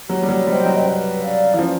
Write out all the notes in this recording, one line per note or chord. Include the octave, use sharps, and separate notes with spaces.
F#3 G4
G3
F#3
G3 C5 D#5 G5
F#3
B4
D5 F5
E3
F3 C#4